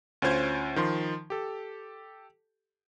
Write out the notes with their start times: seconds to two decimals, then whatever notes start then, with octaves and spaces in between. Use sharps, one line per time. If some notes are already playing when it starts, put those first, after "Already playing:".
0.22 D2 C#4 F4 C5 G#6
0.76 D#3 F3 C6
1.30 G4 A4